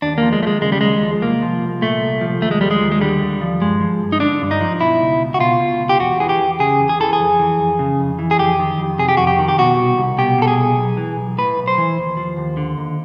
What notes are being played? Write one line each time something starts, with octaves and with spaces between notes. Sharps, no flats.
D#2 D4
F3 A#3
G#3
D#2 A3
G#3
C#3 G#3
G3
D#2 G#3
F3
C2 A#3
F3
C2
A#2 A3
C2
F3
D#2 A3
G#3
F3 G3
G#3
D#2
G#3
D3 G3
D#2
F3
G2 G#3
F3
G2
D#4
D3 D4
G2
D#4
F3
B2 E4
C#2
C#2
F#4
B2 F4
B2
C#2
G4
E2 F#4
E3 G#4
G4
E2
C#3 G#4
E2
G#4
E3 A4
G#4
F2
E3
F2
C#3
F2
E3
G#4
F2 G4
D#3
F2
C3 G#4
G4
F2 F#4
G4
D#3
G4
B2 F#4
C2
C2
B2 G4
B2 A4
G#4
C2
B1
E3
B1
A2 B4
B1
C5
E3
D#2
F3
D#2
D3
D#2